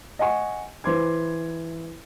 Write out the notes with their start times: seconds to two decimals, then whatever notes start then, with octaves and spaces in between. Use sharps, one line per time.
0.19 D#5 F#5 G#5 C#6
0.84 E3 C5 C6 D6 G#6